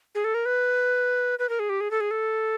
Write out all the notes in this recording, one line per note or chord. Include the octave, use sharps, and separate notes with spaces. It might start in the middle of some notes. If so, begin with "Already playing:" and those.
G#4
A4
A#4
B4
B4
A#4
G#4
G4
G#4
A4
G#4
A4